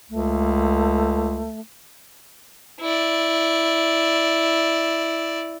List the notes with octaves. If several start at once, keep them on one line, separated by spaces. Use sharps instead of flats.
C#2 A3
E4 D5